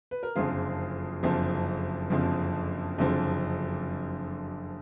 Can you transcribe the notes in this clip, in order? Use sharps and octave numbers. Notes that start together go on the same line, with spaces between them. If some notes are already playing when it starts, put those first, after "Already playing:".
B4
A#4
F#1 F2 D3 F3 F4 G#4
F#1 F2 D3 F3
F#1 F2 D3 F3
F#1 F2 D3 F3